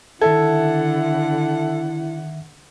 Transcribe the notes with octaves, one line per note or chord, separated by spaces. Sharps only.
D3 D#3 E4 A4 E5 F#5 G#6